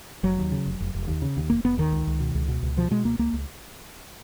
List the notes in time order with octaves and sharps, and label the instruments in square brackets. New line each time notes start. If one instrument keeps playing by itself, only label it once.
[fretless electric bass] F1 F#3
D#2
C#3
F1
F1
F1
D#2
C#3
D#2
F1 A#3
F1 B3
D#2 D#3
C#2
C#2
B2
C#2
B2
C#2
B2 F3
B2 G#3
C#2 A#3
C#2 A#3
C#2